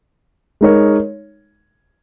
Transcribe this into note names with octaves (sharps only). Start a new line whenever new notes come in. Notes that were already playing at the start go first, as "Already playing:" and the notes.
G#3 D#4 A#4 C#5